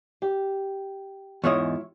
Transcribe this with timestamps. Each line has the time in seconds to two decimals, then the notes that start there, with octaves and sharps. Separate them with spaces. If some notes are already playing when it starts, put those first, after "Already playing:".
0.22 G4
1.44 E2 G#2 E4 F4 C#5 D#5